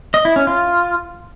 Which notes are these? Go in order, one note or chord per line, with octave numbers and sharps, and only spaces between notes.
D#5
E4
C#4
F4